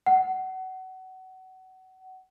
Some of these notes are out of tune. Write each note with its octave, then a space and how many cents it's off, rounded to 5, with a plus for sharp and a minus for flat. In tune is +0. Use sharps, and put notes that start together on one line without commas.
F#5 +25